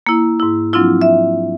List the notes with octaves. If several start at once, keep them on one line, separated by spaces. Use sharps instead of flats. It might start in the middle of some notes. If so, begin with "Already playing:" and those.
A#3 E4
G#2 E4
F3 F#3 C4 D4 E4 F4
E5